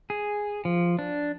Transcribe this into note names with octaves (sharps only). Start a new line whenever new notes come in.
G#4
F3
D4